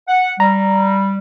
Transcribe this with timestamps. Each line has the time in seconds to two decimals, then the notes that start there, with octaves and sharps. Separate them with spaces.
0.08 F#5
0.40 G3 A#5